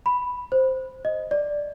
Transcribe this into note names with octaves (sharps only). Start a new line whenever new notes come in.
B5
C5
D#5
D5